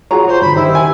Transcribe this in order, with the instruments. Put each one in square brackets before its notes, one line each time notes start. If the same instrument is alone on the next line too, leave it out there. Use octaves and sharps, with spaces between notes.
[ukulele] F4 A#5 [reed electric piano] F#4 G#4 C#5
[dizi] C5 [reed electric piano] C#5
[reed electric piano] G2 D3 [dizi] B5
[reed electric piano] D#3 G4 C5 [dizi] E4 [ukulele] D#5
[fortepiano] G#5